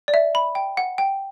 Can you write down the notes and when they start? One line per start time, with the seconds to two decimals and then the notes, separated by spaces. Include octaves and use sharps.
0.08 D5
0.14 E5
0.35 B5
0.55 G5
0.77 F#5
0.98 G5